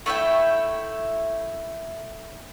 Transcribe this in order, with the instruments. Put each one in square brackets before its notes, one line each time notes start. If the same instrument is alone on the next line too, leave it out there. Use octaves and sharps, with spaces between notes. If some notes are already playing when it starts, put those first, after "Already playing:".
[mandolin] A3 E4 E5 G5